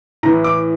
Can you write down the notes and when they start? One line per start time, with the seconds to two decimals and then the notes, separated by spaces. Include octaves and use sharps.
0.23 A2 E3 A#5
0.44 D6